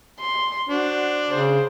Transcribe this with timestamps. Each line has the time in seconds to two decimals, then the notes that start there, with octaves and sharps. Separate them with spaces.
0.20 C6
0.69 D4 F#4 C5
1.30 C#3 C5